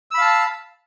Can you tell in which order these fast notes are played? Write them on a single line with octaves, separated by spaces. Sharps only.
E6 B5 F5 A5